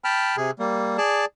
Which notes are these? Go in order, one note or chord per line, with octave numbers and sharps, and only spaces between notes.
G5 A5 B5 F6
C3 G#4
G3 A#3
G#4 D5 A5